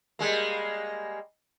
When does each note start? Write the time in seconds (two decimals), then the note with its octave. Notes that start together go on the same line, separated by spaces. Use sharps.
0.19 G3 G#3 A#3